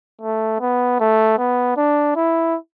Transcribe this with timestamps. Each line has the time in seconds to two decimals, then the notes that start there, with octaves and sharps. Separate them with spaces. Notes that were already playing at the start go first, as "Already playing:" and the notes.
0.21 A3
0.60 B3
1.00 A3
1.38 B3
1.77 D4
2.16 E4